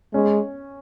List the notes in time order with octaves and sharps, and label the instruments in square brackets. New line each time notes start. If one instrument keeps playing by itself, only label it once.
[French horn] G#3 [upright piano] C#4